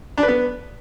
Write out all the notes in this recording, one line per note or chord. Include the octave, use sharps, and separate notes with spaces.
D4
B4
B3